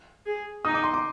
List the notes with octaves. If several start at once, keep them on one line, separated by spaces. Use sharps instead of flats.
G#4
D#4 D#6
D6
C6
D6